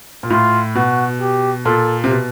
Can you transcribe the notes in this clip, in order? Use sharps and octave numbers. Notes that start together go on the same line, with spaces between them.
A#2
A2 F4
B2 F#4
G4
A#2 A4
C3
B2